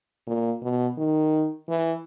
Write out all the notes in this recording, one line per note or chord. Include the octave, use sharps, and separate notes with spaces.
A#2
B2
D#3
E3